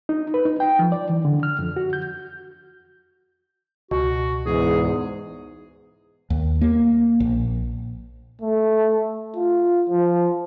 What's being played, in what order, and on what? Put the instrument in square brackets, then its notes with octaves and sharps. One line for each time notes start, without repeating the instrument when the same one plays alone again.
[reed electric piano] D#4
B4
D#4
G5
F3
D5
E3
D3
F6
F2
F#4
G6
[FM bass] C#2 [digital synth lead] B2 [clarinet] F#4
[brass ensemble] E2 G#2 [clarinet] G#4
[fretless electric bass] D#2
A#3
A#1
[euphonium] A3
F4
F3